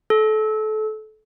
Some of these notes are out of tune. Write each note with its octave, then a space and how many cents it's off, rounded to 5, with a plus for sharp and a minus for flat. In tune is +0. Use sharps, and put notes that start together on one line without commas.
A4 -25